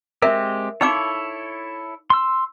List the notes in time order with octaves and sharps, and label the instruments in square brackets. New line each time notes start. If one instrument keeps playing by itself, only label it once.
[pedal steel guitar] G#3 C4 G4 [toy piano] A#4 E5
[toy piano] D#4 F5 D6 [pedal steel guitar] E4 A4 C#5
[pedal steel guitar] C6 E6